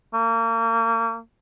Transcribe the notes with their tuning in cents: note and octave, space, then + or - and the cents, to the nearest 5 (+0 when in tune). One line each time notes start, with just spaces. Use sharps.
A#3 -35